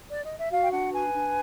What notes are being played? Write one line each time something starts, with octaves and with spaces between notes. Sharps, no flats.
D5
D#5
E5
F#4 F5
G5
D4 F#5
B4 G#5
D4